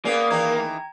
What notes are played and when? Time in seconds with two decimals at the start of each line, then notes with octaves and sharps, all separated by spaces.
0.05 A#3 B3 C#4 G#4 D5 F5
0.31 D#3 E3 D#4 G5 A#5 G#6